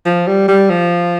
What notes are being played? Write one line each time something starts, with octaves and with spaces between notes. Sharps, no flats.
F3
G3
G3
F3